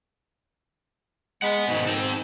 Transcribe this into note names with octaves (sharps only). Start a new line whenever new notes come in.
G#3 F#5 B5
G#2 B2 D#3
C4 A4